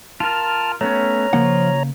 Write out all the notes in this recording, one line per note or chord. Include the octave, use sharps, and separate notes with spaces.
F4 A#4 A5 F6
A3 B3 C#4 C#5 A#5
C#3 F3 A#3 F#5